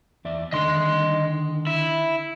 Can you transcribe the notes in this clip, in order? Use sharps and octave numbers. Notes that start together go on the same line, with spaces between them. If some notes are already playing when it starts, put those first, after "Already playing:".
E2 D5 E5
D3 D#3 D#5 C6
E4